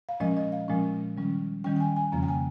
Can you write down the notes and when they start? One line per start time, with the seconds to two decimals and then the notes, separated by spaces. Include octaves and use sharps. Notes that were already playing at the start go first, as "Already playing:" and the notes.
0.09 F5
0.20 A#2 F3 G#3 C#4 D#5
0.37 D#5
0.52 F5
0.68 A#2 F3 G#3 C#4
1.17 D#3 G3 C#4
1.64 D#3 G3 C#4 G5
1.76 G5
1.80 G#5
1.96 G#5
2.12 F2 C#3 F3 A#3 C#4 A#5
2.23 G5
2.28 G#5